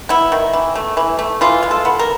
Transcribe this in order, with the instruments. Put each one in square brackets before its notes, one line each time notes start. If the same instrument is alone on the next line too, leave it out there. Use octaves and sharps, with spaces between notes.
[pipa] B3 E4
D#3
E3
A3
E3
A3
E3 F4
G#3
A4
B3
A#4